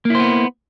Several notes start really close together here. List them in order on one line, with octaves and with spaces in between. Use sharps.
A#3 E4 C5 B3